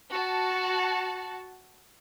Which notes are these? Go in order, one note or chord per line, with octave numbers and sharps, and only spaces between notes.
F#4 A5